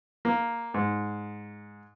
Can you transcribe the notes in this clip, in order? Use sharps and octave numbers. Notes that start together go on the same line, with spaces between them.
A#3
G#2